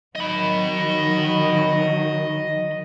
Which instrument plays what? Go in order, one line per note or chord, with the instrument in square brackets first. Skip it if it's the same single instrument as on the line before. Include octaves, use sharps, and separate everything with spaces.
[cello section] D#3 F#3 [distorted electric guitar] D#5 B5